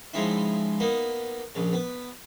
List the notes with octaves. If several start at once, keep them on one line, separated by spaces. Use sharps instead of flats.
C#3 F3 G#3 C4 D#4 E4
A#3 B3 D#4
A#1 C#3
B3